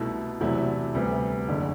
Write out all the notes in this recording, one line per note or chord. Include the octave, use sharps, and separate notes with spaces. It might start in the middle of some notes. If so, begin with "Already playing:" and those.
Already playing: C2 B2 A3 E4
E2 C3 F#3 A3 E4
D2 C3 G3 B3
F#1 E2 D3